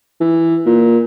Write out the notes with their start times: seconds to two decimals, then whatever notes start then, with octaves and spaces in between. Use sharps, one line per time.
0.21 E3
0.66 A#2